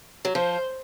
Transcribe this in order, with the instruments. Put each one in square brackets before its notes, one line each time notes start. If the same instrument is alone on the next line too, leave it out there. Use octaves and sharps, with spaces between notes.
[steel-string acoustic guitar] F#3
[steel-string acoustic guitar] F3 [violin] C5